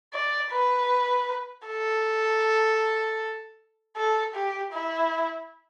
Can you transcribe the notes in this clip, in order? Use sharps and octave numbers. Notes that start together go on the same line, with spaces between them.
D5
B4
A4
A4
G4
E4